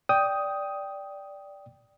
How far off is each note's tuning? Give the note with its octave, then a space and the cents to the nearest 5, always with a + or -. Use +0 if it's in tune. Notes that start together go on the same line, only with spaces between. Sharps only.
D5 -10 G5 +0 D#6 +10